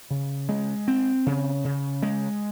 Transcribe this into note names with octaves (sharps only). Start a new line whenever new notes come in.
C#3
G#3
C4
C#3
C#3
G#3